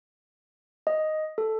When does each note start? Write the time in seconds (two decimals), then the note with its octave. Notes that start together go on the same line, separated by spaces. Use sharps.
0.87 D#5
1.38 A4